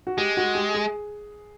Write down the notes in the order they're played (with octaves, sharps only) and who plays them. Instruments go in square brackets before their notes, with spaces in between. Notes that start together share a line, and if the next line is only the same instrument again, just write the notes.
[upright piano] F#4
[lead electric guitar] G#3 [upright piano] G4
[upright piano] F#4
G4
G#4